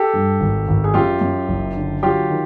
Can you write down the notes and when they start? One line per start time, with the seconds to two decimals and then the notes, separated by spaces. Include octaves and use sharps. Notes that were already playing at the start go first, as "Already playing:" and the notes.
Already playing: G4 A4
0.14 G2
0.40 G#1
0.68 G#1
0.84 G#4
0.94 F#2 F4 G4
1.21 F#2
1.48 F#1
1.76 D3
2.03 F#3 F4 G4
2.30 D#3